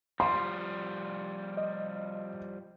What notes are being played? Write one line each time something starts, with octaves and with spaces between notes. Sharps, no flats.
F3 G3 C6
D#5